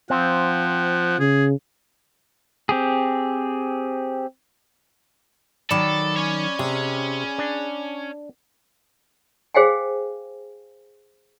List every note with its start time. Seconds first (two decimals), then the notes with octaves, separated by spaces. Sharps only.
0.10 F3 C4 F#5
1.20 C#3 G#4
2.69 C4 G4 G#4
5.71 D#3 F#3 A4 D5 B5 D6
6.17 C#4 C#5
6.59 C3 G#4
7.38 D4
9.54 G#4 C5 F5 G5 G#5